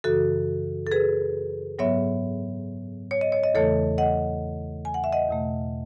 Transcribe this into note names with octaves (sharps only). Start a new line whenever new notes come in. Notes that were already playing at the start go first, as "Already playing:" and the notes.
F#2 C#3 E3 F#4 A4
A4
G#4 B4
G#2 F#3 B3 C#5 E5
C#5
D#5
C#5
D#5
E2 C#3 E3 A3 A4 C#5
D#5 F#5
G#5
F#5
E5
D#5 F#5
E2 B2 A3